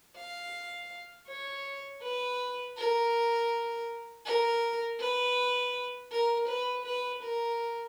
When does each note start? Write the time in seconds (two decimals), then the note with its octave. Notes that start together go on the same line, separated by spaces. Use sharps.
0.17 F5
1.28 C#5
2.02 B4
2.77 A#4
4.26 A#4
5.00 B4
6.12 A#4
6.49 B4
6.85 B4
7.23 A#4